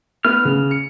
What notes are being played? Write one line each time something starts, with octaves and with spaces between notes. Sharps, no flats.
B3 B4 F6
C#3
C#7